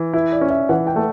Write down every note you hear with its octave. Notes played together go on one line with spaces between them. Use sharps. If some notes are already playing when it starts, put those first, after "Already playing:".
Already playing: E3
E4 B4
D5
C#4
E5
E3 F#5
G5
A3